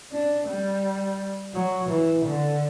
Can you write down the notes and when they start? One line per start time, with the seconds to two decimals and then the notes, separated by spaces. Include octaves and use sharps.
0.12 D4
0.47 G3
1.55 F#3
1.89 E3
2.26 D3